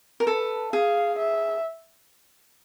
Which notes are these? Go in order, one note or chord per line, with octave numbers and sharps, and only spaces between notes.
A#4
A4 B4
G#4 F5
E5